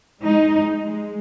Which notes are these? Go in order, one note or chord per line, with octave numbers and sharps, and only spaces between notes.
G#3 D#4
G#3